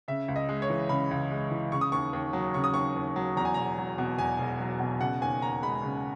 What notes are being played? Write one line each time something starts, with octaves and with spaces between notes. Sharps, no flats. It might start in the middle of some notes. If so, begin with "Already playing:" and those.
C#3 E5
C#2
D#5
G#3
C#5
E3
C#3 B5
C#2
G#3
E3
C#3 C#6
D#6
D#2 C#6
D#2
F#3
C#3 C#6
D#6
D#2 C#6
D#2
F#3
E2 A#5
G#5
E1 A#5
F#3
B2
E2 G#5
E1
F#3
B2
C#3 F#5
D#2 G#5
D#2 A#5
G#3 B5
C#3